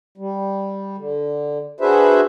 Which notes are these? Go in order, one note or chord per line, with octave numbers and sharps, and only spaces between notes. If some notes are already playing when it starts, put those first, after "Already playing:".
G3
D3
D4 F#4 G#4 B4 C5 E5